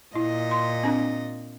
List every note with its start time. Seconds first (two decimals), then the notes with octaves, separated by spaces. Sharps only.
0.15 A#2 E4 D#5
0.51 C6
0.83 C4 D4